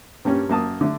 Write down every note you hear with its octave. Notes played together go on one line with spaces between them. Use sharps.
G2 G3 A#3 C#4
F#2 A#3 A5 D#6
D3 A3 D4